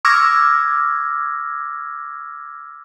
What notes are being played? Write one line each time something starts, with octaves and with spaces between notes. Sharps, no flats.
C#6 D6 E6 F6 G#6 A#6